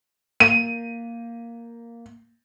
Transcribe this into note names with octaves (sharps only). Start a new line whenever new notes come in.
A#3 D#7